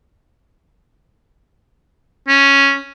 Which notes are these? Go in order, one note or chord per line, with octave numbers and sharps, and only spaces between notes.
C#4